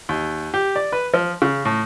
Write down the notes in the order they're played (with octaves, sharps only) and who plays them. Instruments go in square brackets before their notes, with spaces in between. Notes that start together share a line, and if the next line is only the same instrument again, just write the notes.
[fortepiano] D#2
G4
D5
B4
F3
C#3
A2